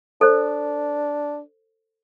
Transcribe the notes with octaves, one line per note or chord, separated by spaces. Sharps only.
D4 A4 C5